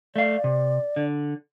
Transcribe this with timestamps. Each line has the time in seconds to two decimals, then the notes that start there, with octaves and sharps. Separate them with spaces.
0.16 A3 D5 F5
0.44 C3
0.96 D3